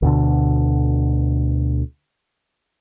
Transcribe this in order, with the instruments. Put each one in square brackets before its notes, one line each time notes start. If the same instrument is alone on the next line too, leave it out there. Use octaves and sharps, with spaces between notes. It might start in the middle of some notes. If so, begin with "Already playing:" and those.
[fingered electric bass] D2 B2 D3